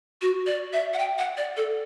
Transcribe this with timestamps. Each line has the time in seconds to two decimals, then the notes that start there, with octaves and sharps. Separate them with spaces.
0.22 F#4
0.46 D5
0.73 E5
0.94 F#5
0.99 G5
1.18 F#5
1.37 D5
1.57 A4